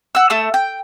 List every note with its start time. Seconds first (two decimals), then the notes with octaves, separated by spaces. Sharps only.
0.15 F#5 E6
0.30 A3 A5 D#6 E6
0.54 G5